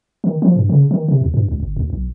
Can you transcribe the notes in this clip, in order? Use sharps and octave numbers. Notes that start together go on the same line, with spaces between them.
D#3
F3
G2
C#3
D#3
C3
D#2
G2
C#2
G1
D2
B1